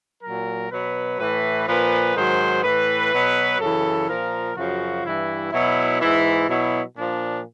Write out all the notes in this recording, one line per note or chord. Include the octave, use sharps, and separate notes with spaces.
A#2 F#3 A#4
B2 F#3 B4
A2 E3 B4
A#2 F3 B4
G#2 D#3 F#3 C5
A2 E3 B4
B2 F#3
F#2 C#3 E3 A4
A#2 F3 A#4
F#2 C#3 F3 F#4
G2 E3 E4
B2 F#3 E4
G#2 E3 E4
B2 F#3 E4
A#2 F3 D4